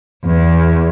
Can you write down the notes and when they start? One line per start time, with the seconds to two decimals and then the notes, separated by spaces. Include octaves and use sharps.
0.25 E2 E3